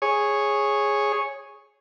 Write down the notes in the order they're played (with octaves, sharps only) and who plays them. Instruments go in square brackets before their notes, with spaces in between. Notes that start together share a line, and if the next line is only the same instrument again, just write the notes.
[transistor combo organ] G#4 C#5